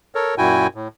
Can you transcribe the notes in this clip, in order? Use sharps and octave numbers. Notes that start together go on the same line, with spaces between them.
A4 A#4 C#5
F#2 A#2 E4 F#4 G5 G#5
A2